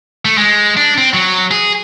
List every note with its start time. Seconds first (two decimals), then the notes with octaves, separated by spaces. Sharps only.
0.25 A3
0.38 G#3
0.77 D4
0.98 C4
1.14 F#3
1.51 G#4